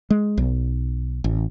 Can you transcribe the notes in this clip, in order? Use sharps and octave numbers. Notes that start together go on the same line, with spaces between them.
G#3
B1
A1